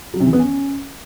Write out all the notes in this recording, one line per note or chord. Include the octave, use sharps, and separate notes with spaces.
F#3
C3
E3
B3
C#4